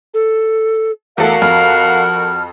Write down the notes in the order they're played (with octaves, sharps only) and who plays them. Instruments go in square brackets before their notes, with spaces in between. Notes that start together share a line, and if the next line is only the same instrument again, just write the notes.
[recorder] A4
[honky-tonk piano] E2 A3 A4 [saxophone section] F#4 A#4 [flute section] F5 F#5
[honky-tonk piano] F2 [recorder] F6